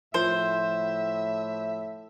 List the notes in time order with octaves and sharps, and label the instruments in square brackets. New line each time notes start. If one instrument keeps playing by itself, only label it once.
[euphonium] A2 [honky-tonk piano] F3 [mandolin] C5 [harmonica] E5